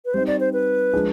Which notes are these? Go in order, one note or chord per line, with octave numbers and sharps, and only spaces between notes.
B4
G3 C4 D#4 C5
D5
C5
B4
F3 G#3 D4 G#4